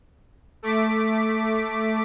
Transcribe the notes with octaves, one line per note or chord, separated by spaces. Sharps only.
A3 D6 B6